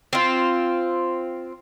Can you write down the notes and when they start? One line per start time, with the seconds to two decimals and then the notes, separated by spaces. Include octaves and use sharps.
0.13 C4 F4